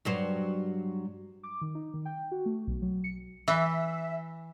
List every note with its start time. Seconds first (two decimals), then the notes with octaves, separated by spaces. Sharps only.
0.05 G2 F#3 C5
1.43 D6
1.61 D#3
1.75 D#4
1.94 D#3
2.05 G5
2.32 F#4
2.46 A3
2.67 B1
2.82 F#3
3.04 C#7
3.48 E3 E5